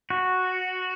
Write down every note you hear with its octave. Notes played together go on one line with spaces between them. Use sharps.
F#4